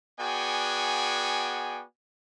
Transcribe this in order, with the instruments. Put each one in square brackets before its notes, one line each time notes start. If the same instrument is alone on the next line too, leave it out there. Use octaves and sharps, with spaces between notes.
[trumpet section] B3 F#4 G#4 D5 G5 G#5